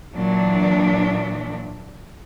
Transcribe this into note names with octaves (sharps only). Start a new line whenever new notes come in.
A#2 E3 F#3 D4